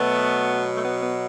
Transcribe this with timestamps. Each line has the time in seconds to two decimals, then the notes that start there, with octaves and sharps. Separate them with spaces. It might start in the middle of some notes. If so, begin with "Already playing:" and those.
Already playing: B2 F#3 A3 B3
0.77 A3
0.85 B3
1.03 B3